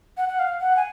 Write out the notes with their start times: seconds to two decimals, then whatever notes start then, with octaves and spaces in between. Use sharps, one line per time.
0.17 F#5
0.29 F#5
0.39 F5
0.61 F#5
0.77 G#5